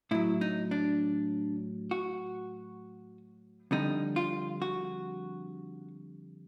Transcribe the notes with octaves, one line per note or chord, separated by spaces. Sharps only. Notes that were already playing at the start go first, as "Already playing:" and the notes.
A2 F#3 E4
D#4
D4
F#4
F2 D3 G3 D#4
F4
F#4